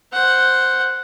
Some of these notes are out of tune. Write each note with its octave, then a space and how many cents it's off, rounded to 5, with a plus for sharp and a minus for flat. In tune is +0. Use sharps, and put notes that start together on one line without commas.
C5 +0 F#5 +0